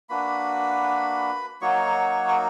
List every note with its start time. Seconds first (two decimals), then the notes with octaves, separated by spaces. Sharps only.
0.09 A#3 D4 F#4 B4 B5
1.61 F#3 A#3 D#4 F#4 C#5 C#6
2.28 C#6